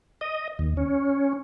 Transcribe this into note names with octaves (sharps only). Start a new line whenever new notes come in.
D#5
D#2
C#4